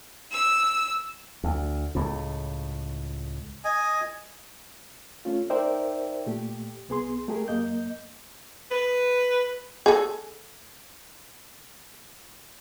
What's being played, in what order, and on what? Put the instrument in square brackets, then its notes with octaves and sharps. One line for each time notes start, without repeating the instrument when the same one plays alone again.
[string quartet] E6
[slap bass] D2
C#2 A2
[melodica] D#5 G#5
[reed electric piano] A3 C#4 F4
D#4 A#4 C5 D5 E5 G5
A#2 A3 G4
C2 B3 G#4 C6
A3 G4 G#4 A#4
F#2 A#3 D#5 G6
[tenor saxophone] B4
[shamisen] G#4 A4